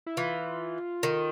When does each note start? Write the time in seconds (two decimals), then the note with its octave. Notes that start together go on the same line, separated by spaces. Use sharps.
0.06 E4
0.17 E3 F4
1.03 D#3